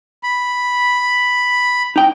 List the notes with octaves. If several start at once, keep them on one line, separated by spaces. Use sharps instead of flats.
B5
D#4 G5